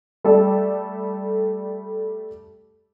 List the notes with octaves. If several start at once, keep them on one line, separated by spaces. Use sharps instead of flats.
G3 A3 A4 D5